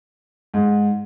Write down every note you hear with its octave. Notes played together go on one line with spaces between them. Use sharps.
G#2